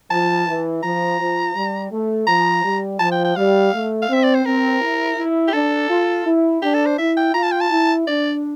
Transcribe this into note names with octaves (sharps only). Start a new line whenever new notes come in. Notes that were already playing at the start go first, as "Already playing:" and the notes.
F3 A5
E3
F3 A#5
F3
G3
A3
F3 A#5
G3
F3 A5
G5
G5
G3 F5
A3
F5
C4 E5
D5
C5
C4 A#4
E4
E4
G4
D4 A4
F4
E4
D4 G4
A4
C5
E4 E5
G5
F4 A#5
A5
G5
A5
E4
D4 D5